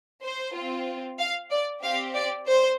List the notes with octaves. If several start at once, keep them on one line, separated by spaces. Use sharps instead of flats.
C5
C4 F4
F5
D5
C4 G4 F5
D5
C5